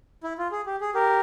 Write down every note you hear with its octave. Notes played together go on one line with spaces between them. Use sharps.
E4
F4
G#4
G4
G#4
G4 A#4